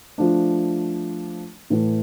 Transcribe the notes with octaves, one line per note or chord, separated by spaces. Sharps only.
F3 A3 D4
A2 E3 A3